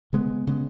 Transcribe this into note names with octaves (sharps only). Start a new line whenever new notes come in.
C#3 G#3 B3
C#3 G#3 B3